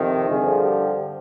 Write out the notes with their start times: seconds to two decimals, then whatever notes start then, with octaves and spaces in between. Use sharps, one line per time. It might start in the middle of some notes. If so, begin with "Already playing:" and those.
Already playing: F2 C3 D#3
0.28 G2 D3 F3 G#4
0.63 G4